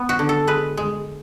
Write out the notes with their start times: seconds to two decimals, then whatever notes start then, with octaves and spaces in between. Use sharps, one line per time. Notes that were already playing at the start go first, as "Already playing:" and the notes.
Already playing: B3
0.09 F#4
0.19 D3
0.29 A4
0.47 G#3 B4
0.77 G#3